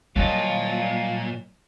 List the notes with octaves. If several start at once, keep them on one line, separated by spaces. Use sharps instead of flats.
A#2 F#3 G3 D#5 F5 A5